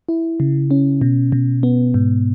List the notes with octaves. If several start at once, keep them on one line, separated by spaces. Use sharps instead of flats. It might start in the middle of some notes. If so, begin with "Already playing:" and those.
E4
C#3
C#4
B2
B2
B3
G#2